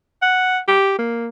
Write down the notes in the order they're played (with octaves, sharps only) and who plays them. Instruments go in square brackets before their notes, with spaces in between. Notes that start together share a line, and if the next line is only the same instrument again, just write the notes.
[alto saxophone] F#5
G4
A#3